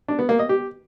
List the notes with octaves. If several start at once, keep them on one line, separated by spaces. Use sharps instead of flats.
D4
B3
A#3
D#5
G4